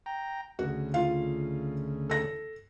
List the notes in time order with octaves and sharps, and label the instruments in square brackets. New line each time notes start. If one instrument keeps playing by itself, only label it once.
[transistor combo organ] G5 A#5
[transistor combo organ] D2 C#3 [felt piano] F#4
[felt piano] F4 F5
A4 A#6